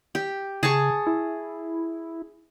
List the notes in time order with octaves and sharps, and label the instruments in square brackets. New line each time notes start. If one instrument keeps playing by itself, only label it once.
[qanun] G4
[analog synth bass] C#3 [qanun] G#4 A5 C#6
[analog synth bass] E4